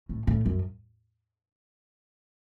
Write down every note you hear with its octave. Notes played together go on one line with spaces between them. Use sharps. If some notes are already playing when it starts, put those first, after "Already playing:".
A2
A2
F#2